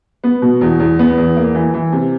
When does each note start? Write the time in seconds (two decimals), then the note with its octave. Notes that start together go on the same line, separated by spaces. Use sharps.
0.24 B3
0.42 B2
0.61 E2
0.80 E2
0.99 B3
1.18 E2
1.36 A#3
1.55 E3
1.74 E3
1.92 C3